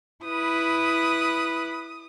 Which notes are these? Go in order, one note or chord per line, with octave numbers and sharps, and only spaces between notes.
E4 B4 D#6